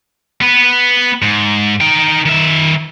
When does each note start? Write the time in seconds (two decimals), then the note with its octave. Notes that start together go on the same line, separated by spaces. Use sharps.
0.42 B3 B4
1.22 G#2
1.81 D#4 G5
2.26 D#3 E5